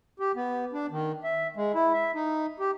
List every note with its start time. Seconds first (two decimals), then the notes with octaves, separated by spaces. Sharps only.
0.20 G4
0.36 B3
0.73 D4
0.91 D#3
1.23 E5
1.56 G#3
1.75 E4
1.93 E5
2.15 D#4
2.60 G4